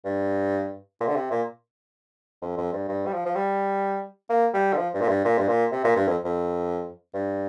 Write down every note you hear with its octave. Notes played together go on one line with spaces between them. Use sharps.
G2
A#2
D3
C3
A#2
F2
F2
G2
G2
G3
F3
F3
G3
A#3
G3
D3
F3
G2
A#2
G2
A#2
G2
A#2
C3
A#2
G2
F2
F2
G2